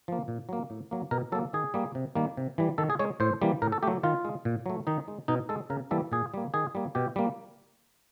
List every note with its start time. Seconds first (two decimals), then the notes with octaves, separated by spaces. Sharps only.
0.08 F3 A#3
0.28 A#2
0.49 F#3 A#3
0.70 A2
0.91 F#3 A#3
1.11 B2 A#4
1.32 F#3 A#3 A4
1.53 D#3 G#4
1.74 G3 A#3
1.95 C3
2.15 D#3 G3 A#3
2.37 C3
2.58 E3 G3
2.78 D#3 A4
2.90 G#4
2.99 G#3 C#5
3.20 A2 C5
3.41 E3 G3 A#3
3.62 A2 A#4
3.72 A4
3.83 F#3 A3 G4
4.03 D#3 F4
4.25 G#3
4.45 A#2
4.66 F#3 A3
4.87 D#3 D#4
5.08 G#3
5.28 B2 D#4
5.49 G#3 A4
5.70 C#3 A#4
5.91 E3 G3 A#3 A4
6.12 A#2 G#4
6.34 G3 A#3
6.54 D#3 G#4
6.75 G3 A#3
6.95 B2 G4
7.16 G3 A#3